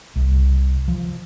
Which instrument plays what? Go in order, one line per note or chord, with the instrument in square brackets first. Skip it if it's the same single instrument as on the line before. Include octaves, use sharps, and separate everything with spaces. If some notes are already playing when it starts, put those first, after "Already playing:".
[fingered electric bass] C2
F3